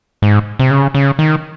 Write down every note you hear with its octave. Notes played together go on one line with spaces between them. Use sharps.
G#2
C3
C#3
C#3
D#3